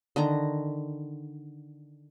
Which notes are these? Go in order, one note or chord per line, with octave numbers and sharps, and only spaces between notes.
D3 D#3 A#5